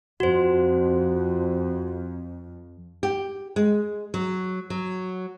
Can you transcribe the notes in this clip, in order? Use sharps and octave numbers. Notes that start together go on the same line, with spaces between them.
F2 F#4 C5
G4
G#3
F#3
F#3